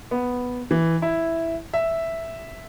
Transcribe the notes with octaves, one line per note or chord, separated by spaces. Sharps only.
B3
E3
E4
E5